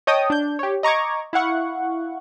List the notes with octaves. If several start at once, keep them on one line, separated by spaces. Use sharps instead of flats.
C#5 D#5 G5 A5 D#6
D4 G6
G4 C#5
D#5 A#5 C#6 D6 G#6
E4 F5 F#5 C#6